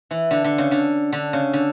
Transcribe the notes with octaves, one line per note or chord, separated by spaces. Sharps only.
E3
D3
D3
C#3
D3
D3
C#3
D3